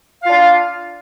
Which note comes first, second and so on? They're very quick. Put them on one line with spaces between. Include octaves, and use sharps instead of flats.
F5 F4 D4